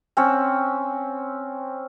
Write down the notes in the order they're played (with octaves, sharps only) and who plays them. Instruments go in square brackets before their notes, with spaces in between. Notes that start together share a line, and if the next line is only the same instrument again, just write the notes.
[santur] C4 C#4 F#5